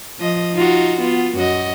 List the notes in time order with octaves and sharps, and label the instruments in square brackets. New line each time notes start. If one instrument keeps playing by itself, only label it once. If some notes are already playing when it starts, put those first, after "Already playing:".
[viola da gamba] F3 D#5
D#4 F4 F#4
B3 F4
F#2 F#4 D#5